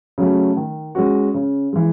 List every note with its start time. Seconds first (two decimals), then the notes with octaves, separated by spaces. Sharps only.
0.18 C#3 F#3 A3
0.56 D#3
0.95 G#3 C#4 F#4
1.34 C#3
1.73 E3 G#3